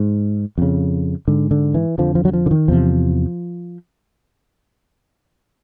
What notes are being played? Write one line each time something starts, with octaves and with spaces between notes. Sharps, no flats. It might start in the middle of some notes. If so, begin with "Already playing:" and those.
Already playing: G#2
F2 C#3
G#2 D3
D3
E3
F2 D3 F3
F3
F#3
F3
D3
D#3
E2 C3 F3